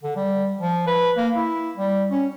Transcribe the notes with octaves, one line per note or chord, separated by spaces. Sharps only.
D3
G3
F3
B4
A#3
E4
G3
C#4